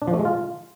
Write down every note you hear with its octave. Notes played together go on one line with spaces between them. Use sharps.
D4
F3
A3
G#3
F4